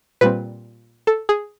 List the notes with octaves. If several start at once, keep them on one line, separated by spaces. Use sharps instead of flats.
A#2 G3 C4 B4
A4
G#4